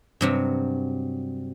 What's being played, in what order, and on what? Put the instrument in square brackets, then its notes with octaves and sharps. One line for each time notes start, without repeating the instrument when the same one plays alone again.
[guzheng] G2 C3 F#3